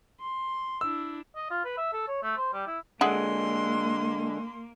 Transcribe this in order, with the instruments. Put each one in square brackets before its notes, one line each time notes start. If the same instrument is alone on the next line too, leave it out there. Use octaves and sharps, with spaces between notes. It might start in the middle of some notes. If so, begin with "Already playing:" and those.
[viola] C6
[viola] D4 E4 [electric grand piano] E6
[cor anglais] D#5
F4
B4
E5
A4
C#5
A3
C5
G3
E4
[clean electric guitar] D3 G#3 [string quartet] A#3 [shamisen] G#4 E5 F#5 [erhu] C6